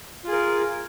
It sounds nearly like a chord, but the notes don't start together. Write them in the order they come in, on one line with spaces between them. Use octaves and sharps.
F4 G#4 A#4